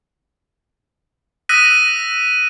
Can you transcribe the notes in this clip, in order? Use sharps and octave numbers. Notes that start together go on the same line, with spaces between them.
D#6 E6 F#6 A#6 B6 D#7